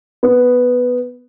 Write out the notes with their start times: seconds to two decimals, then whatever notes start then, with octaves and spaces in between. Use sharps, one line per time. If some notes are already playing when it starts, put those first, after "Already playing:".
0.23 B3